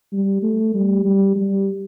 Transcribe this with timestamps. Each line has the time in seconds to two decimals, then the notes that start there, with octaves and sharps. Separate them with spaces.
0.13 G3
0.43 A3
0.74 G3
1.04 G3
1.36 G3